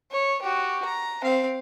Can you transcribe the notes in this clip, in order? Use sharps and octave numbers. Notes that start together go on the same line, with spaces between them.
C#5
F#4 G4
A#5
C4 F5